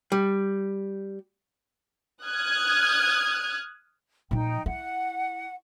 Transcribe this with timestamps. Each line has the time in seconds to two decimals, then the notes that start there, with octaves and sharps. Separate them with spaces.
0.12 G3
2.26 D#6 F6 F#6 G#6
4.31 A#2 F3 D#4 G5
4.66 E4 F#5